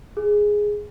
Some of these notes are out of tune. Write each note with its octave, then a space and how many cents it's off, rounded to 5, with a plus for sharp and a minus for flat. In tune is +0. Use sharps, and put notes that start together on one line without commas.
G#4 +0